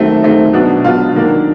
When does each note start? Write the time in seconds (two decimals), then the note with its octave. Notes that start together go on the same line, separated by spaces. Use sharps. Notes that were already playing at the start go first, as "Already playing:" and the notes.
Already playing: D#3 F#3 A3 C4
0.23 D#3 F#3 A3 C4
0.53 B2 F#3 B3 D4
0.84 B2 F#3 B3 D4 F4
1.15 D#3 F#3 A#3 D4